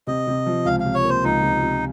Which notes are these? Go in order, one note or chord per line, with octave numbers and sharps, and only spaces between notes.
C3 D#5
C3
F3
C#2 F5
F5
C3
C#5
A#3 C5
C#2 D#4
C3
C3